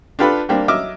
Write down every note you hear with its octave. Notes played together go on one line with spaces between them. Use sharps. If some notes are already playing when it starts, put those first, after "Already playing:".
D4 F4 G4 A4 B4 B5
G3 A#3 C4 D4 G4
F#3 D#5 E5 D6 F6